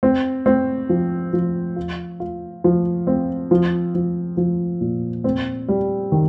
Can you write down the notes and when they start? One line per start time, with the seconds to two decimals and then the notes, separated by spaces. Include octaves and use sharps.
0.03 C4
0.46 C4
0.89 F3
1.33 F3
1.76 F4
2.20 F4
2.64 F3
3.07 C4
3.51 F3
3.95 F3
4.37 F3
4.81 A#2
5.24 C4
5.69 G3
6.12 D#3